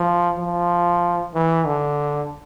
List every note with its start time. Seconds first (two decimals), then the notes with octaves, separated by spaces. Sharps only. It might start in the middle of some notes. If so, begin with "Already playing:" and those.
Already playing: F3
0.39 F3
1.34 E3
1.66 D3